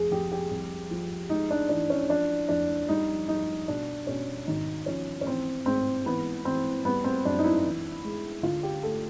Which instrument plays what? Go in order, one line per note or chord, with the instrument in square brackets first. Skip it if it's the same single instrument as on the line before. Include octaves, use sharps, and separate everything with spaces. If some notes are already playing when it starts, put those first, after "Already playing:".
Already playing: [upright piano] F1 G#4
F1 G4
G4
C2
F3
G#3 D#4
D4
E3 D4
C#4
F3 D4
F2 D4
G3 D#4
G3 D#4
B2 D4
B2 C#4
G#1 D#4
F3 C#4
C#4
E3 C4
G#2 C4
E3 B3
E3 C4
G3 B3
C4
F#2 D4
D#4
E4
E3
G#3
D3 F4
G4
A3 A4